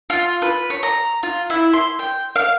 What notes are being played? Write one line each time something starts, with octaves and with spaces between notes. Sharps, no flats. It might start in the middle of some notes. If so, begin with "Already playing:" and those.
F4
B4
C#5
A#5
F4
E4
C6
G5
F5